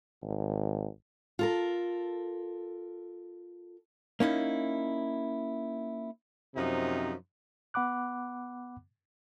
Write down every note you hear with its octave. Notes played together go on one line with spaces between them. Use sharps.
G#1
F4 A4 A#4
A#3 C#4 D#4 E4
F#2 C3 F3 D#4
B3 F#5 B5 D6 F#6